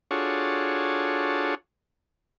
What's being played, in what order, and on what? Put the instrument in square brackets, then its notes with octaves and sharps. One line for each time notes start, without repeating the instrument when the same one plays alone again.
[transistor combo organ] D4 F4 F#4 G#4 A4 C#5